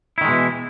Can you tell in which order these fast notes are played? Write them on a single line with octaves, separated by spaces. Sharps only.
E4 D#3 G#3 B2 E3